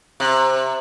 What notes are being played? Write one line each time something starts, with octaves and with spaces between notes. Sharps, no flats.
C3